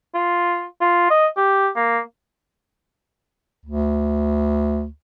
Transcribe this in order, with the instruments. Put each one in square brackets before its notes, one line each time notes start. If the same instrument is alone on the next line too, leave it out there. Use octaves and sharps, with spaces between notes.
[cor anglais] F4
F4
D#5
G4
A#3
[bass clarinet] D2